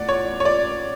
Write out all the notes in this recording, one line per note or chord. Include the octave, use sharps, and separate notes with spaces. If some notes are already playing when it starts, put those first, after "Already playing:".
Already playing: A2 D5 F#5
C#5
C#5
D5